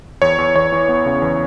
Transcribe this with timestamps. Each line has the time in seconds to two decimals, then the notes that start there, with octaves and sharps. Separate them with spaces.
0.22 E2 C#5
0.38 E2
0.56 E2 C#5
0.72 E3
0.89 B3
1.06 C#3
1.22 E2